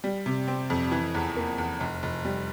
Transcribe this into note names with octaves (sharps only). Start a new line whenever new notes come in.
G3
C3
C4
F2
E3
E2
A#3
E2
F1
F1
G3